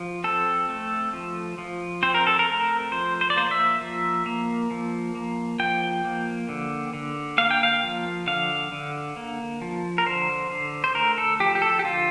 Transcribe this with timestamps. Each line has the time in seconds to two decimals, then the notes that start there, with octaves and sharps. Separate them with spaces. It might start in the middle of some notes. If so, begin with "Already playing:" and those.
Already playing: F3
0.24 C4 A4
0.69 A3
1.13 F3
1.58 F3
2.03 C4 C5
2.15 A#4
2.27 A4
2.39 A#4
2.47 A3
2.92 F3 C5
3.21 C5
3.30 D5
3.36 A#3 C5
3.51 E5
3.81 F3
4.26 A#3
4.71 F3
5.15 A#3
5.59 F3 G5
6.05 A#3
6.49 D3
6.94 D3
7.38 A#3 F5
7.51 G5
7.63 F5
7.83 F3
8.27 D3 F5
8.72 D3
9.17 A#3
9.62 F3
9.98 A#4
10.06 D3 C5
10.51 D3
10.84 C5
10.95 A3 A#4
11.18 A4
11.40 F3 G4
11.55 G4
11.62 A4
11.79 G4
11.84 D3 F4